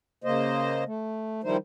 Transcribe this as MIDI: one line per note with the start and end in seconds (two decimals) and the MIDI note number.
0.24 0.84 49
0.24 0.84 58
0.24 0.84 72
0.24 0.84 75
0.86 1.41 57
1.44 1.57 51
1.44 1.57 53
1.44 1.57 55
1.44 1.57 63
1.44 1.57 64
1.44 1.57 72